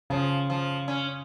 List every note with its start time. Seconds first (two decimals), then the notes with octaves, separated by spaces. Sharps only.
0.10 C#3 F3
0.50 F3
0.88 C#4